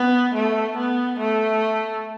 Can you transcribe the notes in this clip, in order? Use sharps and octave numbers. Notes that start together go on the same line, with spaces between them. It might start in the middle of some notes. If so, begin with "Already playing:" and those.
Already playing: B3
A3
B3
A3